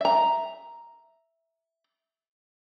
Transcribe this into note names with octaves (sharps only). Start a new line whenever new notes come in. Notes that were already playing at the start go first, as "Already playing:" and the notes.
E5 A#5